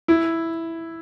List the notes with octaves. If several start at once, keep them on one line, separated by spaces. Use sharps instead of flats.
E4